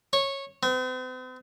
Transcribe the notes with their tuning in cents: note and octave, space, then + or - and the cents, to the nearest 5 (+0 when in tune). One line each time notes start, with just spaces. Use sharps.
C#5 -15
C4 -45